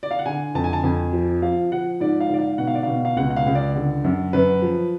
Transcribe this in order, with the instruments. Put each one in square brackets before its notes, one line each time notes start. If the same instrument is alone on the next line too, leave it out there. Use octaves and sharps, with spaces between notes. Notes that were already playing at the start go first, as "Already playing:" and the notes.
[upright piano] D5
F5
F#5
D3 G#5
F2 A5
G#5
A5
F2 G#5
F3
F3 F5
F3 F#5
G#2 D5
F5
G#2 D5
F5
B2 F#5
F5
D5
B2 F5
F5
C#2 F#5
F#5
F5
C#2
D5
D3
F#2
F#2 B4
F3